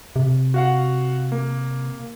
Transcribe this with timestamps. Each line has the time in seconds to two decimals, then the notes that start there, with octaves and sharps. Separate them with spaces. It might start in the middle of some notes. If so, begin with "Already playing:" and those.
0.16 C3
0.54 F#4 F5 F#5
1.32 A#3